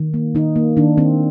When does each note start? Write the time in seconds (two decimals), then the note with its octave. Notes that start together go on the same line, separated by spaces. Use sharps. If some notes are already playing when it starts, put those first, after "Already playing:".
Already playing: D#3
0.14 A#3
0.35 D#3 D#4
0.56 A#3
0.77 D#3 D4
0.98 D#3 C4